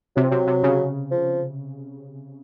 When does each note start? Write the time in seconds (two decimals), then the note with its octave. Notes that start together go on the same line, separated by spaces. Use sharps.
0.16 C3 F#3
0.24 F3
0.30 C3 F#3
0.47 C3
0.63 C#3
1.11 F3